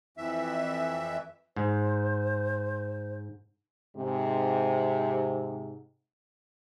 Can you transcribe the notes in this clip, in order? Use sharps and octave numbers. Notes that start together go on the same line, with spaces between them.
F2 E3 E5
G#2 C5
G#2 C3